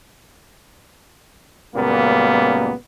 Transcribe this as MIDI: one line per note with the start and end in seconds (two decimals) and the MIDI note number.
1.75 2.73 37
1.75 2.73 42
1.75 2.73 46
1.75 2.73 55
1.75 2.73 58
1.75 2.73 59